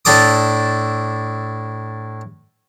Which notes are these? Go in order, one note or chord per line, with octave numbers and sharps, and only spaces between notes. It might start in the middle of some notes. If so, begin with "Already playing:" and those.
A2 D4 A4 D6 D#6